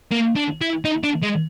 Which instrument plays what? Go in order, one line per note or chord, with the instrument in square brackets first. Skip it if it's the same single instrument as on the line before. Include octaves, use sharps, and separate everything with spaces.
[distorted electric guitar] A#3
D4
E4
D#4
D4
G#3